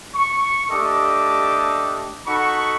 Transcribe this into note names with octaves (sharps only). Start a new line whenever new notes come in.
C#6
A3 D4 G4 A4 D#5 D6
D#4 F#4 A4 B5 C#6